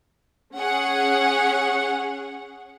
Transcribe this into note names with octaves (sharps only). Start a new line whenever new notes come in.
C#4 G#4 C#5 F#5